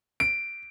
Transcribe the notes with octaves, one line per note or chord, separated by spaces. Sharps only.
D7